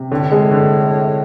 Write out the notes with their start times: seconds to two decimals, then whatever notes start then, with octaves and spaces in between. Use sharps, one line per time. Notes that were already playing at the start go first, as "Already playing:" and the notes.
Already playing: C3
0.12 A2 D3
0.32 G#3
0.51 D3